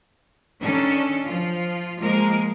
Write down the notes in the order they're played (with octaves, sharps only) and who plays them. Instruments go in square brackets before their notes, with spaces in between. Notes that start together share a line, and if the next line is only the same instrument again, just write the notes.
[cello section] D#3 C#4 D4 A4
F3 F4
F3 G#3 A#3 A#4